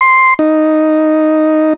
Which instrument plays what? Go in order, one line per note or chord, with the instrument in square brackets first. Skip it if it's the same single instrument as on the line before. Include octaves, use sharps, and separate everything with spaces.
[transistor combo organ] C6
D#4